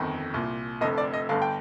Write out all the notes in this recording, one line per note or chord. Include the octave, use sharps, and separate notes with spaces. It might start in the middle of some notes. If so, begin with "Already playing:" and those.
Already playing: G1 F2 D#3
C2 A#2
F1 F2 D3 D#5
D5
D#5
G1 G2 D3 F5
G5